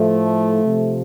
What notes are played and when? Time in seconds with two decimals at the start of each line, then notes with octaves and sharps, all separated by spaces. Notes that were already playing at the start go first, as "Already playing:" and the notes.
Already playing: A2 F3 A3
0.64 C3 F3